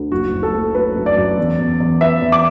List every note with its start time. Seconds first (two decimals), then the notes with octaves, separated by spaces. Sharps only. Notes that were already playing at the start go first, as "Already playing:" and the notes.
Already playing: D2
0.11 F#1 F#4
0.33 F#1
0.43 A4
0.54 A3
0.74 F#3 B4
0.96 F#2
1.06 D5
1.17 F#2
1.38 E2
1.59 E2
1.80 E2
2.01 B3 E5
2.22 E2
2.32 D6